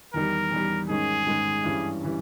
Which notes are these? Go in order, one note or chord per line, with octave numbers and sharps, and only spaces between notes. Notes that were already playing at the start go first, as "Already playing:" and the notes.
E2 D#3 G3 A#4
E2 D#3 G3
G#2 D#3 G#3 C#4 G#4
G#2 D#3 G#3 C#4
G2 E3 G3 C#4
E3 G3 C#4